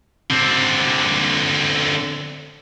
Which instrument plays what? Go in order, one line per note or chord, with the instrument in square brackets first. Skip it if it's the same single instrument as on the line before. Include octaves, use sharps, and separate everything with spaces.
[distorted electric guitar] D3 C4